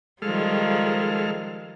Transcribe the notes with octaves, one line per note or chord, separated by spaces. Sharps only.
D#3 F3 G3 G#3 A4 F6